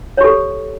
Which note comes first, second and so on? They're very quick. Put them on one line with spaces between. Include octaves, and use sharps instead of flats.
C#5 G4 A4